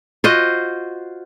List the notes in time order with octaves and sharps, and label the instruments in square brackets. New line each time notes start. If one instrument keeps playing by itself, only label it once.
[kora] F4 F#4 C5 D#5